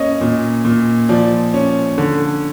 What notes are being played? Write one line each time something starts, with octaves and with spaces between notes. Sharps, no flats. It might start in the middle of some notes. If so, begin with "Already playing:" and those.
Already playing: A#3 C#4 D#5
A#2
A#2
F3 D5
C#4
D3